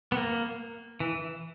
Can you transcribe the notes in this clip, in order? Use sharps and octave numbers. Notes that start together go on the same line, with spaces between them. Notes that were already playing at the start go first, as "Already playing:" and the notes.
B3
A#3
E3